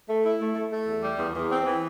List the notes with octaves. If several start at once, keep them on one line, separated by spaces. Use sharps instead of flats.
A3
E4
A3
A3
A3
E2
G3
E2
E2
C4
E3